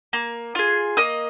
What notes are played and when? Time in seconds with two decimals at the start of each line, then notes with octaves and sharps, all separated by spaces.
0.13 A#3
0.55 F4 G#4
0.97 A#3 D#5 D#6